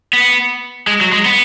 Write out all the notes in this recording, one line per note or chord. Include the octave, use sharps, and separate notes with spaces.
B3
G#3
F#3
G#3
B3